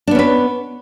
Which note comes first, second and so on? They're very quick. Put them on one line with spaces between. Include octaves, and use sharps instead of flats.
D4 B3 C#4 B4